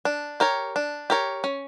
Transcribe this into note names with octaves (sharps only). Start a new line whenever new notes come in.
D4
G4 A#4 C#5
D4
G4 A#4 C#5
C#4